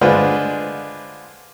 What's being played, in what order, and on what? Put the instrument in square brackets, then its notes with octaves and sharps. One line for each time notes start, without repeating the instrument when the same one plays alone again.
[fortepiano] D3 G#3 D4 F4 B4 C5